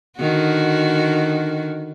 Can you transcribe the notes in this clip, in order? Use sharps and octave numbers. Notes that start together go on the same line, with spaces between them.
D3 D#3 F#4